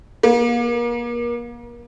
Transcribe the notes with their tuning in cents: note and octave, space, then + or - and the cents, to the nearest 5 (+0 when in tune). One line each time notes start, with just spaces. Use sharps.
A#3 +35